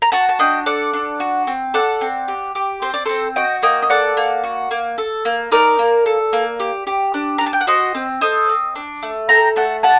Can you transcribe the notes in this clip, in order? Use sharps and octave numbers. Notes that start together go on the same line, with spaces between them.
A#5
F#4 F#5 A5
A5
D4 D#5 G5
A4 D5 F#5
D4
F#4
C4
A4 D5 F#5
C4
G4
G4
C4 C5
D5
C4 A4 C5
F#4 D#5 G5
A#3 D#5 G5
D#5
A4 D5 F#5
A#3
F#4
A#3
A4
A#3
D#4 A#4 D5
A#3
A4
A#3
G4
G4
D4
D4 A#5
A5
G5
F#5
F#4 C5 D#5
C4
A4 C5 D#5
C4
D4
A3
A4 G5 A#5
A3 F#5 A5
G4 F#5 A5